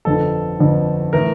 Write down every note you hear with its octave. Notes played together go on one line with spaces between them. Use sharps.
G1 F2 D3 A4
G1 F2 D3
A2 E3 A#4